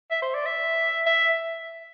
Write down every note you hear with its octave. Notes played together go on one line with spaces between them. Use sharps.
E5
C5
D5
E5
E5